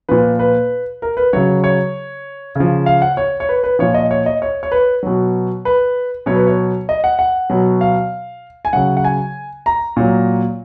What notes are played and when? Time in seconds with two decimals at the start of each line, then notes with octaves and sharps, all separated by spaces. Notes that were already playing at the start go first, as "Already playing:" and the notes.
0.09 A#2 F3 B4
0.39 B4
1.02 A#4
1.17 B4
1.33 C#3 F#3 C#5
1.64 C#5
2.55 C#3 F3
2.86 F5
3.02 F#5
3.17 C#5
3.40 C#5
3.49 B4
3.64 B4
3.79 A#2 F3 C#5
3.94 D#5
4.11 C#5
4.26 D#5
4.42 C#5
4.63 C#5
4.72 B4
5.03 B2 F#3
5.65 B4
6.26 B2 F#3 C#5
6.36 B4
6.47 C#5
6.89 D#5
7.04 F#5
7.19 F#5
7.50 B2 F#3
7.81 F5
8.65 G#5
8.73 C#3 F#3 F#5
8.97 F#5
9.04 G#5
9.66 A#5
9.97 A#2 F#3